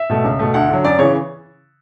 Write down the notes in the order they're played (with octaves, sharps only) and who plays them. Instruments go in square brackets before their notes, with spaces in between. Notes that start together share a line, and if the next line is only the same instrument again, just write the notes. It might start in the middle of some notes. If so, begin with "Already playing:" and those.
Already playing: [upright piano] E5
B2 A3
C#2
B2 A3
D2 F#5
D3 F#3
F#2 D5
C#3 E3 C#5